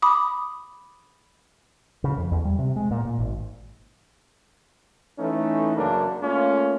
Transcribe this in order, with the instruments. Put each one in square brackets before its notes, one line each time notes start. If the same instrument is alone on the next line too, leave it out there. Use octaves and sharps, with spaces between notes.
[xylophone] B5 D6 D#6
[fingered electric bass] C#3
F2
E2
G3
C3
G#3
A#2
A#2
G#1
[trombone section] E3 A3 C#4 D#4
F#2 C#3 A#3 D4
A3 A#3 C#4 F4